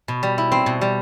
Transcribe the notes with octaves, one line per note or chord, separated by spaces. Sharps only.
B2
G3
E4
C4
B2
G3